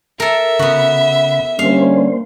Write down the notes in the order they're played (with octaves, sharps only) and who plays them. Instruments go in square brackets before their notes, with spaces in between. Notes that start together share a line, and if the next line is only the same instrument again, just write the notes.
[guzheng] A4 A#4 [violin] E5
[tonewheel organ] C#3 B5 [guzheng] B3 F#4
[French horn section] D3 G3 C#4 [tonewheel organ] A#3 C5 [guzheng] F5